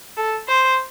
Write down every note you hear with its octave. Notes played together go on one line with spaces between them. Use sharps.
A4
C5